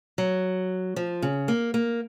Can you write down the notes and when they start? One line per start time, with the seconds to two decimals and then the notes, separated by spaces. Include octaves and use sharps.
0.18 F#3
0.96 F3
1.22 C#3
1.48 A#3
1.74 A#3